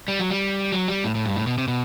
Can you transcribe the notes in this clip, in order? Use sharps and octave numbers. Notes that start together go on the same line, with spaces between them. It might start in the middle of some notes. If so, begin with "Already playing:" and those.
G3
F#3
G3
F#3
G3
A2
A2
G2
A2
B2
C3
B2